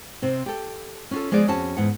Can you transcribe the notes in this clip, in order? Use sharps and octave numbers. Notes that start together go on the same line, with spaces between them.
C3 C4
G4 A4
C#4 F4 A4
F3 G#3 B3 G#4 D5
F2 C#4 F#4 A5
E2 G#2 F#5